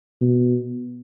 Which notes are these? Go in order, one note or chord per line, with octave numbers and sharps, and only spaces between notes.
B2